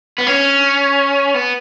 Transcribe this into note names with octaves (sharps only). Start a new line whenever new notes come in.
B3
C#4
B3